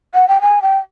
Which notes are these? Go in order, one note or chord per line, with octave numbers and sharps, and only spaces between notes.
F#5
G5
G#5
G5